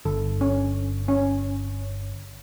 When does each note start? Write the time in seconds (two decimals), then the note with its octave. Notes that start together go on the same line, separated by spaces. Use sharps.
0.05 G1 D3 A4
0.41 C#4
1.08 C#4